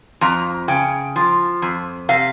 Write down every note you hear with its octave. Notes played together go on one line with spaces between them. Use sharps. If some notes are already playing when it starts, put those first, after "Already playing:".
F2 A#5
C#3 G5
F3
F2
C3 F5